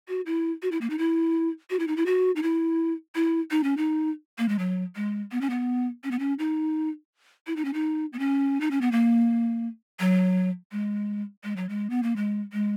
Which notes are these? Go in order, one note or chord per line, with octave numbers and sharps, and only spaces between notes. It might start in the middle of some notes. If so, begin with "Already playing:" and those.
F#4
E4
F#4
E4
A#3
D#4
E4
F#4
E4
D#4
E4
F#4
D#4
E4
E4
D#4
C#4
D#4
A#3
G#3
F#3
G#3
B3
C#4
B3
C#4
B3
C#4
D#4
E4
D#4
C#4
D#4
B3
C#4
D#4
C#4
B3
A#3
F#3
G#3
G#3
F#3
G#3
B3
A#3
G#3
G#3